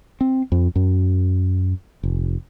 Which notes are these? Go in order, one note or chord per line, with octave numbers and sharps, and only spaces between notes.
C4
F2
F#2
F1